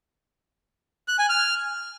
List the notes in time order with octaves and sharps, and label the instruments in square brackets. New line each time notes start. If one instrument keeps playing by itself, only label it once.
[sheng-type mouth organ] F#6
G#5
F6